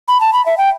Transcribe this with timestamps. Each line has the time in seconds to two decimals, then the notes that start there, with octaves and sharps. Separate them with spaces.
0.08 B5
0.20 A5
0.33 B5
0.46 E5
0.58 G5